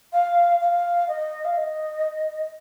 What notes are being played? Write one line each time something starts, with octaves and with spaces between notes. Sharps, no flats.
F5
F5
D#5
F5
D#5